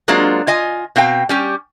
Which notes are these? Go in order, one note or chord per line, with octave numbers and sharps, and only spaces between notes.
F#3 G#3 A#3 C4 D4 F4
F4 D#5 G#5
B2 C4 F5 G5
G3 C#4 G4